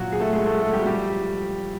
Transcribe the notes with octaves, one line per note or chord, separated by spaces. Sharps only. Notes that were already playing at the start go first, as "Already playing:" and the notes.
Already playing: A#2 F#3 F#4
G#4
A3 A4
G#3 G#4
A3 A4
A3 A4
G3 G4
F#4
G3 G4
F3